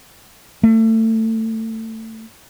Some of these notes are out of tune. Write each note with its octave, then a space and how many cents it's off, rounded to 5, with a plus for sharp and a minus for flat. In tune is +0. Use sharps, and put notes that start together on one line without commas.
A3 +25